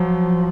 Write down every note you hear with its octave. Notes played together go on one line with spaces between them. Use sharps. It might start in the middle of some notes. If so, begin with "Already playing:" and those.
Already playing: F3 F#3